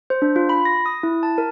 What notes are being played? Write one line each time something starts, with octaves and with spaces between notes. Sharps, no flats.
C5
D4
F4
B5
A#6
D#6
E4
A5
A#4